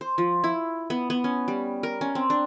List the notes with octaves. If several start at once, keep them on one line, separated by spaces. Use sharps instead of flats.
C5
F3
E4
B3
B3
C#4
G3
A#4
C#4
C4
D4